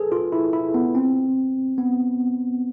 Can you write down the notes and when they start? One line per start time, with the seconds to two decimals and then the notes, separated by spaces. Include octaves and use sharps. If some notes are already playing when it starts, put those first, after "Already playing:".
Already playing: G#4 A4 B4
0.12 F4
0.32 E4
0.53 E4
0.74 B3
0.95 C4
1.78 B3